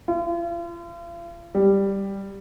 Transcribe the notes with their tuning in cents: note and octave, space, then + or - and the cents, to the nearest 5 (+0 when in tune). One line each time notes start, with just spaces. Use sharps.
F4 -40
G3 +5